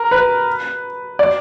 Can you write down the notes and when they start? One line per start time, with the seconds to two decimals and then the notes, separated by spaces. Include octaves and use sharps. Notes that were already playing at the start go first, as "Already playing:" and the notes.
Already playing: A#4
0.11 B4
1.19 D5